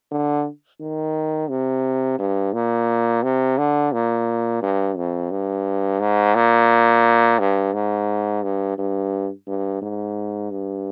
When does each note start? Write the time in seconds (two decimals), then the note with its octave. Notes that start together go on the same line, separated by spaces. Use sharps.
0.11 D3
0.81 D#3
1.49 C3
2.19 G2
2.53 A#2
3.23 C3
3.58 D3
3.92 A#2
4.62 G2
4.97 F2
5.31 G2
6.00 G#2
6.35 A#2
7.39 G2
7.73 G#2
8.43 G2
8.78 G2
9.47 G2
9.82 G#2
10.51 G2